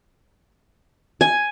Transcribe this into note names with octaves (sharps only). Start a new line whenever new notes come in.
G#5